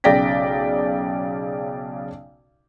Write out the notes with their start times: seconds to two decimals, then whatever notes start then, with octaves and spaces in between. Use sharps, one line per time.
0.04 B1 C#3 D5 G5 A#6 B6